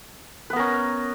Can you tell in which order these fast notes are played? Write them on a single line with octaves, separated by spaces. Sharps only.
B4 B3 A#4 C#4